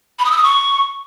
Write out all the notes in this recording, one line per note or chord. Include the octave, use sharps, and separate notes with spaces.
B5
D#6
E6
D#6
C#6